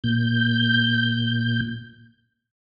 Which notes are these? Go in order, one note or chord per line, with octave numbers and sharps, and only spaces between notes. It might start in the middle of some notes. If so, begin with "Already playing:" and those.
A#2 G6